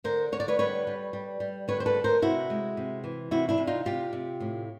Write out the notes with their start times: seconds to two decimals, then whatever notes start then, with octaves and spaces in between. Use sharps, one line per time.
0.04 D3 A#4 C5
0.32 D3 C#5
0.40 D5
0.48 B4 C#5
0.59 G3 B4 C#5
0.87 G3
1.13 G3
1.40 G3
1.68 D3 B4 C#5
1.80 C5
1.86 A4 B4
1.95 D3
2.04 A#4 C5
2.22 C3 E4 F#4
2.50 G#3
2.77 C3
3.04 E3
3.31 C3 E4 F#4
3.49 D4 E4
3.58 C3
3.67 D#4 F4
3.85 C3 F4 G4
4.13 C3
4.40 A2